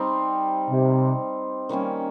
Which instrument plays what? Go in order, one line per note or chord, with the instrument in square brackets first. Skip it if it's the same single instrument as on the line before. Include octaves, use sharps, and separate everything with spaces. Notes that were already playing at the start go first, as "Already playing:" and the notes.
Already playing: [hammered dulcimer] G3 C4 D#4
[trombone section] C3
[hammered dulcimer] D#3 G3 A#3 C#4